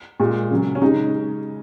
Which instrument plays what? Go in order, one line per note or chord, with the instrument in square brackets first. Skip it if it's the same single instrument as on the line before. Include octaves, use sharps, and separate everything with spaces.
[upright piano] A#2 G#3
C#3 F#3
C#4
C#3 G#3 D#4